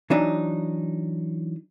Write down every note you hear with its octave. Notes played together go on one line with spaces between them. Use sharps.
E3 F#3 D4 D#4